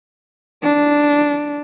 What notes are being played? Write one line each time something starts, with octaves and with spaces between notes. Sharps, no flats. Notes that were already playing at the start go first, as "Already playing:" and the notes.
D4